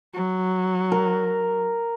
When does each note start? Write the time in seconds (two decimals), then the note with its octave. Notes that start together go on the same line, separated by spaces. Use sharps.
0.14 F#3
0.92 A#4